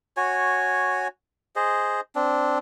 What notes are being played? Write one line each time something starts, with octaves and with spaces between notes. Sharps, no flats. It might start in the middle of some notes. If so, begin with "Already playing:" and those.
F#4 C#5 G#5
G#4 C5 D#5
C4 D4